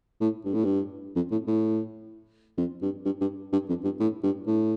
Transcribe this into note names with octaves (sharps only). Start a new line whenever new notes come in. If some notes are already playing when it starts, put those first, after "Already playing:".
A2
G2
A2
G2
F2
A2
A2
F2
G2
G2
G2
G2
F2
G2
A2
G2
A2